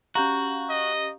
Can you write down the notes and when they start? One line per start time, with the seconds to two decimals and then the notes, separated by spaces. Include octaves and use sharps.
0.15 C#4 F#4 G4 F5 A#5 C#6 G6
0.69 D#5